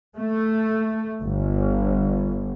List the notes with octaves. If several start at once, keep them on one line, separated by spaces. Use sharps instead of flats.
A3
G1